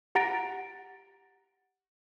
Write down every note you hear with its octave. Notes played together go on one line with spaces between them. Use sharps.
G4 F#5 A#5 A6 A#6 D7